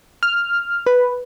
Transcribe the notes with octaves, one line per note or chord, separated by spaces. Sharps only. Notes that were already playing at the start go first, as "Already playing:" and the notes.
F6
B4